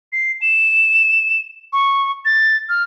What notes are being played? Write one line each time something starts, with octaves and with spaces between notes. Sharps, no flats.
C7
E7
C#6
A6
F6